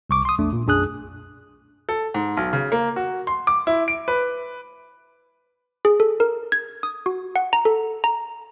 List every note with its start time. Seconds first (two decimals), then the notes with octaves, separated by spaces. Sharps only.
0.10 C2 C#6 D6
0.25 C6 D#6
0.38 A#1 E2 A3 D4
0.53 A#2
0.66 B1 F#2 D4 G#4 D#6 F#6
1.89 A4
2.14 G#2
2.37 B1
2.53 C#3
2.72 A#3
2.96 F#4
3.27 C6
3.47 D6
3.67 E4
3.88 D7
4.08 B4
5.85 G#4
6.00 A4
6.20 A#4
6.52 G#6
6.83 D#6
7.06 F#4
7.36 F#5
7.53 A#5
7.65 A4
8.04 A#5